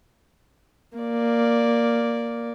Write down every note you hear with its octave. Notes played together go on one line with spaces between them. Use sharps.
A#3 D5